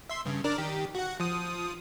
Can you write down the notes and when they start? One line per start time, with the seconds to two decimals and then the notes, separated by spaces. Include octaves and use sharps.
0.10 E5 C6
0.25 G2 C#3
0.44 D4 A#4 D5
0.58 D#3 G4
0.95 F#4 F#5
1.20 F3 D#6